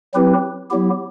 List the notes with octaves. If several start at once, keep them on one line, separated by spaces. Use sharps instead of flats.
F#3 C4 E4 G4 B4
F#3 B3 E4 G4